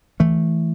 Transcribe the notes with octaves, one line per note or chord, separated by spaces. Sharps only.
D2 E3 A3